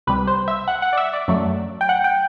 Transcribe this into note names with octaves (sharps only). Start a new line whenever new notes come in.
C2 C3 G3 B4
C5
E5
F#5
F#5
D5
E5
D5
F#2 F#3 A3
G5
F#5
G5